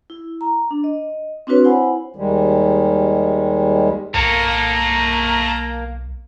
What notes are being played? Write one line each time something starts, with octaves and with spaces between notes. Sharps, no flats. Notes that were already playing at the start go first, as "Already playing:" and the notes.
E4
A#5
D4
D#5
C4 D4 E4 F#4 B4 C#5
E4 C5 F#5 G#5 B5
D#2 D#3 G3 G#3
B1 A#3 A4 C#5 A#5